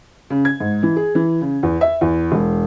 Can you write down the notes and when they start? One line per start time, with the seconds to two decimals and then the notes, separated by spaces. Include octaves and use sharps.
0.30 C#3
0.45 G#6
0.60 G#2
0.83 E3
0.96 G#4
1.15 E3
1.41 C#3
1.63 E2
1.81 E5
2.01 E2
2.32 E1